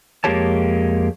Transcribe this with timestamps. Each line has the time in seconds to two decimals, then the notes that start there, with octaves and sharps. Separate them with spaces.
0.24 F2 G#3 A#3 G4 C#5 A5